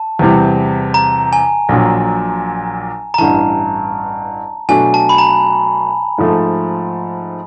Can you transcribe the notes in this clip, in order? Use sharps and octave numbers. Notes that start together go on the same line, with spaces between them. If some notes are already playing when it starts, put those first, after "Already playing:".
Already playing: A5
E2 C3 E3 G3
A#5
G#5
A#1 A#2 F#3
A#5
A1 G2 E3 A5
B2 F#3 A3 D4 F#4 G#5
A5
B5
A#5
G#2 F3 A3